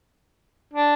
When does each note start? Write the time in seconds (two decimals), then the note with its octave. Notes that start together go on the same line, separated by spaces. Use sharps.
0.74 D4